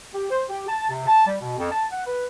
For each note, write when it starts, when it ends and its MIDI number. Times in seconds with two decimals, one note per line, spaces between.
0.13 0.26 67
0.30 0.42 72
0.48 0.63 67
0.67 0.86 81
0.90 1.05 48
1.07 1.23 81
1.26 1.35 55
1.41 1.57 47
1.58 1.69 41
1.71 1.83 81
1.91 2.00 78
2.05 2.25 71